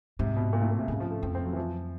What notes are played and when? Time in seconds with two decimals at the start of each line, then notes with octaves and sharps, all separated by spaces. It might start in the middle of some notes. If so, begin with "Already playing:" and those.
0.19 G#2 C3
0.36 B2
0.53 A#2
0.62 A2
0.71 A#2
0.79 C3
0.88 G#2 C#3
1.00 F3
1.11 A3
1.23 F2 C4
1.35 C4
1.45 F#3
1.53 E3
1.57 F3